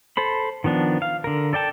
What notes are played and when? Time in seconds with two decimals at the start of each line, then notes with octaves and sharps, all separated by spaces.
0.17 A4 C5 B5
0.64 D#3 F3 B3 D4
1.02 F5
1.24 D3 A#4
1.53 A4 D5 G5 A5